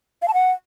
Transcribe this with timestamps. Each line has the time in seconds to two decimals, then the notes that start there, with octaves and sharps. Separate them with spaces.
0.22 F5
0.28 A5
0.34 F#5